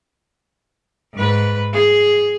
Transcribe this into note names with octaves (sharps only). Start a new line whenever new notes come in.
G#2 B4
G#4